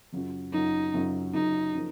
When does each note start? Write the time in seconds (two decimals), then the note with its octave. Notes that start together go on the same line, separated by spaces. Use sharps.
0.12 F#2 C#3 F#3 C#4 F4
0.53 F#2 C#3 F#3 C#4 D#4 F4
0.94 F#2 C#3 F#3 C#4 F4
1.33 F#2 C#3 F#3 C#4 D#4 F4
1.74 C#3 F3 A#3